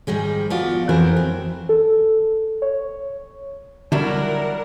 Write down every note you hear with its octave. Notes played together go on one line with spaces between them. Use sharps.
G#2 D#3 G3 G#3
F3 B3 F4 F#4 D5
F2 E3 E4 F#4 A#4 C5
C4
A4
C#5
D3 F#3 G3 D4 E4 A#4 F#5